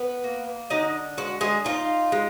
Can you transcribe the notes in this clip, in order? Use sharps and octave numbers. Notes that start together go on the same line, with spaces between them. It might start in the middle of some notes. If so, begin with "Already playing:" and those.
Already playing: B3 B4
A#3
D3 D#4 D#5
G#3 F#4
G#3 G#4
D#4 F4
G#3